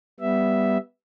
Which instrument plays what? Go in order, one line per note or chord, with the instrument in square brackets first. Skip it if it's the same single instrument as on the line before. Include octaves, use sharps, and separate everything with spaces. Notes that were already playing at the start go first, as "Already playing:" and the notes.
[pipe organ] G3 B3 E5